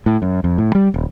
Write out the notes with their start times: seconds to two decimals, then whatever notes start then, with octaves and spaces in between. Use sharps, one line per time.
0.06 A2
0.22 F#2
0.44 F2
0.58 A2
0.75 G3
0.94 D#1